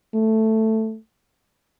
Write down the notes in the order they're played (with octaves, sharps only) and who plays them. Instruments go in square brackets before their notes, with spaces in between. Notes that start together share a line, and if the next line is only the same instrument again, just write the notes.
[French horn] A3